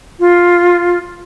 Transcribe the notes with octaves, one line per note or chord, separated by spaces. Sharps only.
F4